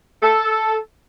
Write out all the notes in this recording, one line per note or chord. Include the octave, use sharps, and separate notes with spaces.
A4